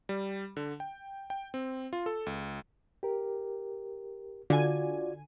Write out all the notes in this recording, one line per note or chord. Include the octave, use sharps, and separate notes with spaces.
G3
D3
G5
G5
C4
F4
A4
C#2
G4 A#4
D3 F4 F#4 D5 G#5